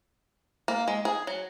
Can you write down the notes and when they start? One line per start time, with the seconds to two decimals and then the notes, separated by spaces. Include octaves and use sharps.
0.68 A#3
0.88 G#3
1.05 G#4
1.27 F#3